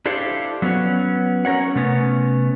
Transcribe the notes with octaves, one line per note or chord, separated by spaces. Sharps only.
D4 E4 G4 A4 C5 F5
F#3 B3 C#4 F#4
C#4 A#4 C#5 F#5
C3 A3 B3 C#4